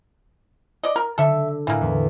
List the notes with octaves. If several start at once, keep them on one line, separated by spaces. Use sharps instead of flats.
D5 D#5
A#4
D3 A4 E5
A2 E3 A#3
E2